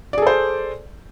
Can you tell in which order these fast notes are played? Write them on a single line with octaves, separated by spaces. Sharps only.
D5 G#4 A4 C5